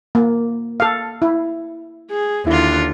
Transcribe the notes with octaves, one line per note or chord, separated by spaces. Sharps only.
A#3
A4 F5
E4
G#4
D#2 D3 E4 F4